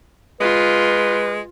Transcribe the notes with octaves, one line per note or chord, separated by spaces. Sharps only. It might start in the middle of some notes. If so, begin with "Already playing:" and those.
G#3 F4 B4